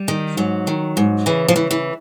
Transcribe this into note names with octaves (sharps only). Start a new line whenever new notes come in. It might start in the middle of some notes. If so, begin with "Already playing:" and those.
Already playing: G3
D#3
G#2 F#3
D#3
G#2
C#3 E3
F3
E3
E3